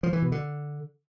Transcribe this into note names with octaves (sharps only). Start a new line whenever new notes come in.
F3
E3
B2
D3